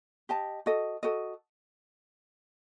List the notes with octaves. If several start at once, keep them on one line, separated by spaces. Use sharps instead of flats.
G4 D#5 A5
F#4 A4 D#5
F#4 A4 D#5